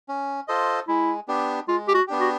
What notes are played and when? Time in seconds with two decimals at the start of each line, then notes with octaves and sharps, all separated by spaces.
0.09 C#4
0.48 F4 A4 C5 D#5
0.88 G#3 E4
1.28 B3 D4 G4
1.68 G#3 F4
1.88 G4
1.94 F#4
2.07 B3 D4 G4
2.21 F#4